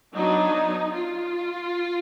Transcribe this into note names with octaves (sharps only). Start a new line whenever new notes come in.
F#3 B3 D4 D#4
F4